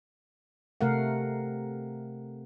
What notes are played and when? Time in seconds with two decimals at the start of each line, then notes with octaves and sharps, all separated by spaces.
0.81 C3 A3 A#4 F5 F#5